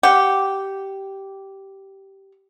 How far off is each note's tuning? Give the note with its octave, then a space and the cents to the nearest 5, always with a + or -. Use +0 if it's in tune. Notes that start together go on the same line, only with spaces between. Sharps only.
G4 -10 F#5 +0